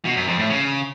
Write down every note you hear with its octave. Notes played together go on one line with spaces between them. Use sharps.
B2
F#2
F2
A2
C#3